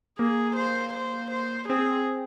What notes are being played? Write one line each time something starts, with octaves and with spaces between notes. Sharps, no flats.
A#3 G#4
C5
C5
C5
C4 G#4